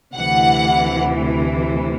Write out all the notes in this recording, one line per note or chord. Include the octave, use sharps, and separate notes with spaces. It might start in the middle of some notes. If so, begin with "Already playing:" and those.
D2 C3 E3 F#5